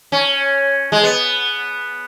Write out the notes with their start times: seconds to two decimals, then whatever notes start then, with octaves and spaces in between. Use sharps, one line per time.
0.12 C#4
0.92 G#3
1.04 B3